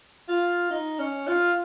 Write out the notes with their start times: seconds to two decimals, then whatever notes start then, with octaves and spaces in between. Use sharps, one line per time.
0.28 F4
0.70 D#4
0.98 C#4
1.27 F4